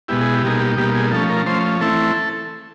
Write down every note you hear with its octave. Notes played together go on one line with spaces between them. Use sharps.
B2 G#3 B3 E4 G4
G#4
G4
B2 G3 A#3 D#4 G#4
G4
B2 G3 A#3 D#4 G4
G#4
F3 A3 C#4 A4
A#4
F3 A3 C#4 C5
E3 A3 C4 E4 A4